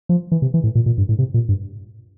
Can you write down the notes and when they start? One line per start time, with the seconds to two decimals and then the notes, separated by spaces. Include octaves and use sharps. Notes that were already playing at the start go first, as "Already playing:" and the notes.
0.09 F3
0.32 E3
0.42 C3
0.54 E3
0.64 A2
0.75 A#2
0.86 A#2
0.98 G2
1.09 A2
1.19 C3
1.34 A#2
1.49 G2